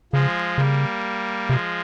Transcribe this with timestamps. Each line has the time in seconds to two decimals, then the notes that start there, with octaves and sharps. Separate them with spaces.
0.13 C#3 F3 G#3
0.58 C#3 G3 A#3
1.49 C3 F3 G#3